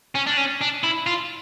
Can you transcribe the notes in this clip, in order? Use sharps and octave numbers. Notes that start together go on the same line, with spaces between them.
C#4
D4
C#4
D4
E4
F4